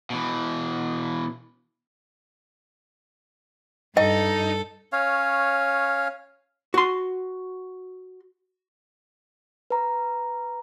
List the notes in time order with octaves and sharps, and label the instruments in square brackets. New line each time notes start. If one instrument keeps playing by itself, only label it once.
[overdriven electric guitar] B2 E3
[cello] G2 [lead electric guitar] D#4 [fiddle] A4 [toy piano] D#5 G5
[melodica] C#4 C#5 F5
[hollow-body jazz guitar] F#4 C6
[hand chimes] B4 A#5